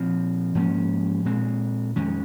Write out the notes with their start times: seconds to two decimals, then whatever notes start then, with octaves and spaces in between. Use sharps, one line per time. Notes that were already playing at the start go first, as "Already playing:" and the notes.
Already playing: A#2 F3 C4
0.55 G#2 F3 A#3 C#4
1.25 A#2 G#3 C4
1.96 F2 D#3 G#3 C#4